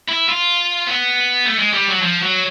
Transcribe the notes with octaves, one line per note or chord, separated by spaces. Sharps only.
E4
F4
B3
A3
G#3
G3
F#3
F3
F#3